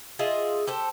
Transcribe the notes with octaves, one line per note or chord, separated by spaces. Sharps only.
F4 G#4 D#5 E5
G4 A4 C5